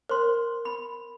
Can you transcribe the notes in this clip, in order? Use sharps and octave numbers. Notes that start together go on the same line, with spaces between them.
A#4 C5 C6
B5